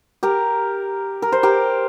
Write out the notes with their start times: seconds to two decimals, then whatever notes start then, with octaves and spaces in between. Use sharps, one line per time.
0.23 G4 A#4
1.22 A#4
1.32 C5
1.43 G4 A#4